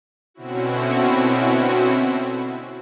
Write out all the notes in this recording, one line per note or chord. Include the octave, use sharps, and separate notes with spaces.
B2 D3 C4 C#4 E4 F#4